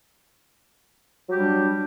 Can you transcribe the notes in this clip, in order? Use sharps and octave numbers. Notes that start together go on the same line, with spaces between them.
F#3 G3 D4 G4